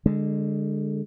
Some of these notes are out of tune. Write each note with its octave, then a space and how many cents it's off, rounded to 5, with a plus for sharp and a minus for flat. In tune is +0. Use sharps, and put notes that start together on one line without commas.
D3 +10 G#3 -15